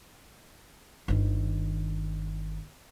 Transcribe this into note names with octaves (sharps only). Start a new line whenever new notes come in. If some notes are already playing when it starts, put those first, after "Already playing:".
G1 D#3